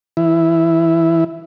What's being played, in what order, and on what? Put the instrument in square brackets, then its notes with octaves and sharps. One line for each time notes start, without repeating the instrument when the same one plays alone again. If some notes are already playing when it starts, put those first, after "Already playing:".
[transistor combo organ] E3 E4